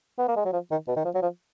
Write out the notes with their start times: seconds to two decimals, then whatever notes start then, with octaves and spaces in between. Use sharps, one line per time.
0.18 B3
0.28 A#3
0.36 G#3
0.45 F#3
0.53 F3
0.71 D#3
0.88 B2
0.96 D#3
1.05 F3
1.14 F#3
1.22 F3